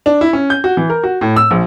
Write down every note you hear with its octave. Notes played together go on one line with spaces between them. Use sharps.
D4
E4
C#4
G6
F#4
E3
A#4
F#4
A2
E6
A#1